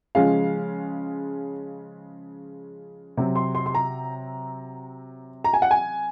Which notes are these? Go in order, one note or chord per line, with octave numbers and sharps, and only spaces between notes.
C#3 F3 G#3 C#4 F5
C3 F#3 C4
C6
C6
C6
A#5
A#5
G#5
F#5
G#5